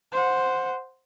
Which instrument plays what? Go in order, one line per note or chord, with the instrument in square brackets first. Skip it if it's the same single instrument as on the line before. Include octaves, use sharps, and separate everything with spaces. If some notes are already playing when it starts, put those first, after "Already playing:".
[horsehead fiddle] C5 F#5